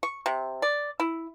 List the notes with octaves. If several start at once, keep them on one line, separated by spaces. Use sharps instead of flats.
C#6
C3
D5
E4